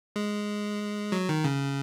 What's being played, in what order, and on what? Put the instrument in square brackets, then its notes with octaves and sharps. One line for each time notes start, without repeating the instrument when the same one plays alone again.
[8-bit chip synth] G#3
F#3
D#3
C#3